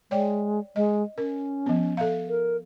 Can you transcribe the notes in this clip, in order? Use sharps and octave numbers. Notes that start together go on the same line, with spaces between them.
G#3 C#5 D5 G5
G#3 D#5
C#4 A#4
F3 B3
A4 E5 F5
A#4